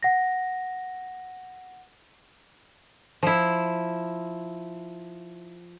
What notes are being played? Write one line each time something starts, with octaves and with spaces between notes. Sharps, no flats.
F#5 A#6
F3 E4